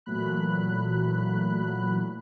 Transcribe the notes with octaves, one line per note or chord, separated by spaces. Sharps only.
A#2 E3 F#3 A3 B5 F#6